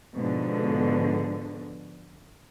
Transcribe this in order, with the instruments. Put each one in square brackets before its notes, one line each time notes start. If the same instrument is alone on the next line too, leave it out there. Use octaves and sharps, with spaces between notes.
[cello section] G#2 B2 D3 F3